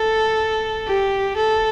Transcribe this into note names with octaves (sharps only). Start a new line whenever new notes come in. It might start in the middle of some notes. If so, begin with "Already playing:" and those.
Already playing: A4
G4
A4